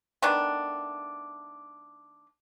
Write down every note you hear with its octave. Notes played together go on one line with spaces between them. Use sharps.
D#3 A3 B3 D4